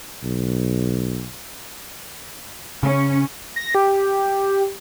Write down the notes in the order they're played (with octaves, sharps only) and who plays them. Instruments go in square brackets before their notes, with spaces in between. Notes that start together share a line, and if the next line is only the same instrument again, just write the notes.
[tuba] B1
[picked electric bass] C#3 [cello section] C#4
[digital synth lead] A#6
G4